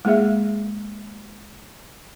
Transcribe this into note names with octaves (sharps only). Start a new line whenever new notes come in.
G#3 A#3 G#4 E5